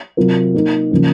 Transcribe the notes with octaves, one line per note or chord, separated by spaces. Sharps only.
C3 F#3 C4 F4 A#4
A#3 D#4 A#4
C#3 F3 A#3 C#4